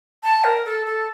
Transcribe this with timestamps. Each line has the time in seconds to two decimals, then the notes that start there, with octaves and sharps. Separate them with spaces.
0.23 A5
0.44 A#4
0.65 A4
0.86 A4